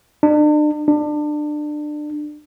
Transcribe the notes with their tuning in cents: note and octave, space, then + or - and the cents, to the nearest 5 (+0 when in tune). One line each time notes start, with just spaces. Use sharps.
D4 +40
D4 +25